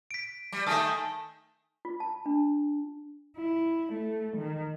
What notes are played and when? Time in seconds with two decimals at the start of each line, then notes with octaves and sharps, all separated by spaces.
0.11 B6 D7
0.53 G3
0.67 D#3 A3 G#5 A5 D#6
1.85 F4
2.00 A5
2.26 D4
3.37 E4
3.93 A3
4.38 D#3